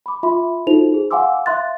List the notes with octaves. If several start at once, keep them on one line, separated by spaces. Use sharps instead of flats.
B5 D6
F4 E5 B5 C6
D#4 F4 F#4 A4 C5 F7
G#4
F5 F#5 G#5 C6 D6 E6
E5 F5 C6 F#6 A6